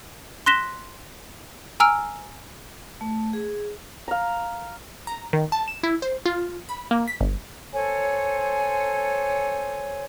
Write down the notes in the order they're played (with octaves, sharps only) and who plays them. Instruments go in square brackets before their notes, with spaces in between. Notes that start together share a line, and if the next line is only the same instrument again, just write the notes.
[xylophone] C6 F#6 A#6 B6 E7 G7
G#5 A#5 E6 F6 D7
[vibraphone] A3
G#4
[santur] F5 A#5
[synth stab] A#5
D#3
A5
E7
E4
C5
F4
B5
A#3
B6
G1
[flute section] A4 C5 C#5 G#5